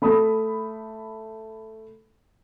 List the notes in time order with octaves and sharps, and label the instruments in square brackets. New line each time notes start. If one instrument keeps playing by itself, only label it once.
[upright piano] A3 B5 D#6